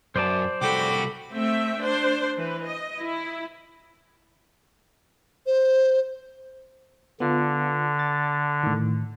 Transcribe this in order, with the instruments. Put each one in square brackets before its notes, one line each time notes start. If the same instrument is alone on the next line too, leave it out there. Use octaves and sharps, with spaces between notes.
[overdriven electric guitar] F#2 [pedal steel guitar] C5 D5 A5
[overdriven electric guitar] C2 F#4 [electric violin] A4 B5 [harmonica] G5 D6
[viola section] A3 C4 E5 G5
D4 C5
E3 B4
D#5
E4
[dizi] C5
[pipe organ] D3 [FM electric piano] B3 F4
[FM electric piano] A6
A2 D#3